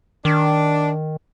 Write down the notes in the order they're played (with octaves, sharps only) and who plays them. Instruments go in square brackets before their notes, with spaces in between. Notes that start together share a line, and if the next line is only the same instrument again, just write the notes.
[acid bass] D#3 [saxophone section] D4